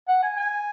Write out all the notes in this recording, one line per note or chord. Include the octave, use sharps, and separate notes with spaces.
F#5
G#5
G#5